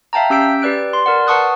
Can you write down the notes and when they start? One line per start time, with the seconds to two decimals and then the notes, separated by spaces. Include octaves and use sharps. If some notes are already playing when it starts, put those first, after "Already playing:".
0.13 E5 F5 G5 A5 A#5
0.30 C#4 G4 E6 G6 B6 D7
0.62 G4 B4 D5 F#6 D7
0.93 C6
1.06 A#4 D5 F#5
1.27 B4 F#5 A5 C#6 D#6 F#6